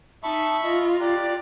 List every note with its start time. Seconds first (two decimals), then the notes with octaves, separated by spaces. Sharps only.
0.23 D#4 E5 A5 B5 C#6
0.63 F4 D#5
1.00 G4 D5 A#5 F#6